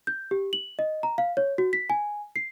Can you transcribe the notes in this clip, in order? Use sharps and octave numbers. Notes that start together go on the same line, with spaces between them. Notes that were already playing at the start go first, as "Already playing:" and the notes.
G6
G4
F#7
D#5
A#5
F5
C#5
F#4
B6
G#5
C7